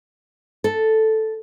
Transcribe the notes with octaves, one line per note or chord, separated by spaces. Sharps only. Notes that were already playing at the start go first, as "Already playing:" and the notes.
A4